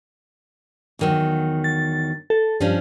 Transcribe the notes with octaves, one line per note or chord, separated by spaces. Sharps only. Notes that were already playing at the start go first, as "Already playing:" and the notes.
E2 D#3 F#3
A6
A4
G2 F3 C#4 D4